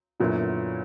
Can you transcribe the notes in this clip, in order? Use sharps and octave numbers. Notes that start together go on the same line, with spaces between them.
F#2 A#2 D3 F#3 B3 E4